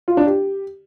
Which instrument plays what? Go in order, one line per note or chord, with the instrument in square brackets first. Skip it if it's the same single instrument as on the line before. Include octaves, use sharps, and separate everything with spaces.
[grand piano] F4
D4
G4